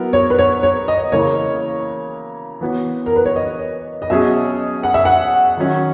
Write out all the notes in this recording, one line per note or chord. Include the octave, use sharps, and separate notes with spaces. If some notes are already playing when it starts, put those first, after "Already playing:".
Already playing: F#3 B3 E4 A#4
C#5
B4
C#5
C#5
D#5
C#3 E3 A#3 E4 A#4 C#5
E3 B3 F#4 C#5
A#4
B4
C#5
D#5
D#5
B2 F#3 C#4 G#4 C#5 E5
F#5
E5
F#5
D#3 F#3 C#4 F#4